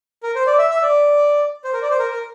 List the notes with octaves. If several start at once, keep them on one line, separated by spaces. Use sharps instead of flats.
A#4
C5
D5
E5
E5
D5
C5
A#4
D5
C5
A#4
A#4